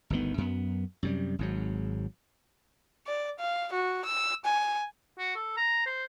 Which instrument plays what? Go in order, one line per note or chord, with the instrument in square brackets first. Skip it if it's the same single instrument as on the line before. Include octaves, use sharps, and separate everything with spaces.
[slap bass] G1 D2 D#3 B3
F#2 B3
F#2 C3 G3
G#1 G#2 F#3
[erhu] D5
F5
F#4
E6
G#5
[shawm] F#4
A4
A#5
C5